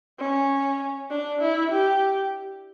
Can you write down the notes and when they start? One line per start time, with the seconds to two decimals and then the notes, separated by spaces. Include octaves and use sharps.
0.19 C#4
1.10 D4
1.41 E4
1.72 G4